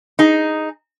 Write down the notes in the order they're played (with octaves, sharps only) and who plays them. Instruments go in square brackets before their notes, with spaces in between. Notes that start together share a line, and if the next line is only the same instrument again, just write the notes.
[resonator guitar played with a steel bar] D#4 G#4